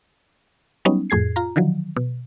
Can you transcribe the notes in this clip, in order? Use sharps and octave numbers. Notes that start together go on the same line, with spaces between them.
F#3 G3 B3 C#4 D#4
F2 A2 G#4 G#6 C7
F4 A#5
D3 D#3 F3 F#3
B2